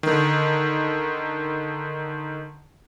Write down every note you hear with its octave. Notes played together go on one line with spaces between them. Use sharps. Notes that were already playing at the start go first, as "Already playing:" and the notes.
D3 D#3